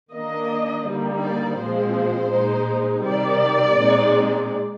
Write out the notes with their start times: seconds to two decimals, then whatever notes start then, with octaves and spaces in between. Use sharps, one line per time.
0.13 D#3 A#3 D4 D#5
0.86 D3 G3 A#3 D#4
1.22 D5
1.58 A#2 F3 G#3 C4 C5
2.31 A#2 G#3 D#4
3.04 C3 D#3 G3 D5
3.77 A#2 G#3 C4 D#4